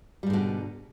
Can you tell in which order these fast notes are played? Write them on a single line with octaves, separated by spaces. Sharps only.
G3 G#2 D3 B2